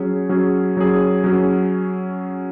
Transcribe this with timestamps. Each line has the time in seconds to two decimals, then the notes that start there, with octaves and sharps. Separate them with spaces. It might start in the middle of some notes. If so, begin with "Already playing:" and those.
Already playing: F#3 C#4 G#4
0.29 F#3 C#4 G#4
0.77 F#3 C#4 G#4
1.24 F#3 C#4 G#4